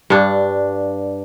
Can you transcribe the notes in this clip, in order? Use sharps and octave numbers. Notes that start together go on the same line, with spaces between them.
G2 D4